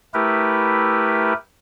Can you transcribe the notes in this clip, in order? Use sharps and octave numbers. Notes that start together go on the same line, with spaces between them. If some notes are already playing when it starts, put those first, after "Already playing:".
A3 E4 G4 A#4 B4